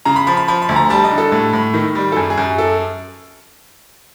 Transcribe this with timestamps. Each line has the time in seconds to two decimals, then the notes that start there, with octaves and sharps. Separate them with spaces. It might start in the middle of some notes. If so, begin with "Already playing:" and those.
0.05 C#3 A#5
0.16 B5
0.27 F3 B5
0.37 B5
0.48 F3 B5
0.62 B5
0.69 D2
0.76 A#5
0.90 G3 A5
1.04 D#5
1.11 D3
1.18 A4
1.32 A2
1.53 A2
1.74 D#3
1.95 G3
2.12 A4
2.16 F#2 G#4
2.30 G#4
2.37 F#2
2.58 A4